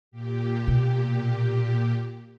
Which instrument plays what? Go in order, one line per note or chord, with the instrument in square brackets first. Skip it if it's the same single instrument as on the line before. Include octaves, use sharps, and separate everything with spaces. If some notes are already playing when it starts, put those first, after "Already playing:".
[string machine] A#2 G4
[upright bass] B2